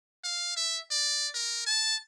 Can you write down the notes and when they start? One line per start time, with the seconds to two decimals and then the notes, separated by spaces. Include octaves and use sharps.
0.24 F5
0.56 E5
0.91 D5
1.35 A#4
1.67 A5